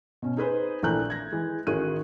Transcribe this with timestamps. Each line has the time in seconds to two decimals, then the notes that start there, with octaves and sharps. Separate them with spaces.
0.22 B2 C#4
0.37 D#4 G#4 B4 C5
0.83 A#1 E3 A3 A#5 F#6 G6
1.10 G#6 A#6
1.32 E3 G#3
1.67 A1 D#3 F#4 G#4 F#6 D#7